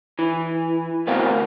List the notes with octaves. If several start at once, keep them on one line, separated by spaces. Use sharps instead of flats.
E3
D2 B2 A#3 C4 F5